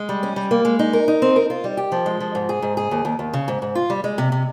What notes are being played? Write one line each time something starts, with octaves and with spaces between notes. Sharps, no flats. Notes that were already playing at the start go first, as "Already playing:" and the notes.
Already playing: G#3
G3
C#4
G3
A#3
G#3
D#4
A#4
D#4
C4
A#4
F4
G3
G4
F3
G#3
F3
G#2
G#4
G#2
G#4
D#2
D#2
D#2
C#3
G#2
G#2
F4
G3
G#3
C3
C3